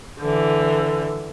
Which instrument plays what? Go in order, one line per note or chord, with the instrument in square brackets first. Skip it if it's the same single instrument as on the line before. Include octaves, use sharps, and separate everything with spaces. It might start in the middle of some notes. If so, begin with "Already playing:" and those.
[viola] D3 E3